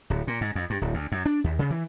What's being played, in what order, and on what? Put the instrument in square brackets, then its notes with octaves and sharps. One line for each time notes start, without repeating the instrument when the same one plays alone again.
[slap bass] D1
A#2
G#2
F2
G2
D1
D2
F#2
D4
D#2
C#3
E3